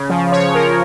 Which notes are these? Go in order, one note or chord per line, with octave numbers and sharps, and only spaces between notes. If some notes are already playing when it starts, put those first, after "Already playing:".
Already playing: C#3
F3
C#3 C#5
F3 A#4